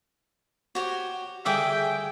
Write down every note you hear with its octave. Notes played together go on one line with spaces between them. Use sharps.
F#4 G4 C5 C#5
D2 G2 C#3 G#4 E5 G5 D6 D#6